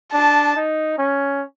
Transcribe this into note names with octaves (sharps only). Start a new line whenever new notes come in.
D4 A5
D#4
C#4